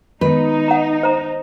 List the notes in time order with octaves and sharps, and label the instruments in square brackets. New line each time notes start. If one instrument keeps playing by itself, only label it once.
[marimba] D#3 G#3 B3 [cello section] D#4 [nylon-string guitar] B4
[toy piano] F#5 A#5
C5 A#5